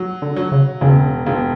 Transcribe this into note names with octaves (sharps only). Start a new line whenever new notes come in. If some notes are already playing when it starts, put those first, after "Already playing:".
Already playing: F#3
D3
F#3
C#3
E1 C#3
E1